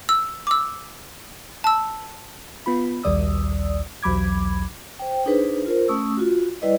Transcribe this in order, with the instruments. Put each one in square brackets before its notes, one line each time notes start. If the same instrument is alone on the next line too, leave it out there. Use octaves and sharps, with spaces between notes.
[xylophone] E6
D6 E6
A5 E6
[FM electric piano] B3 F4 B5
A#1 D#2 G3 D5 D#6 E6
B1 E2 F#3 B5 D6 G#6
[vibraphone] C5 G5
D4 D#4 G#4 B4 C5
F4 A#4 C5
A3 C#4 C#6 D#6 E6
F4 F#4
G3 E4 B4 D5 D#5